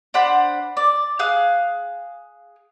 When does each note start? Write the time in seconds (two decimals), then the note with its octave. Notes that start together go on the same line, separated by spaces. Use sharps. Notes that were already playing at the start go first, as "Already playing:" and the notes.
0.14 D4 C5 F#5 B5
0.77 D5
1.19 G#4 F5 F#6